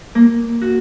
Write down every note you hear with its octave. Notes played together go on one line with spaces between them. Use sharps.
A#3
F#4